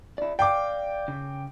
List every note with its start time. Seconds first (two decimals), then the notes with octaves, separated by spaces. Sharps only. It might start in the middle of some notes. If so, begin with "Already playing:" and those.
0.18 E4 D5
0.39 D5 F5 G5 D6
1.08 C#3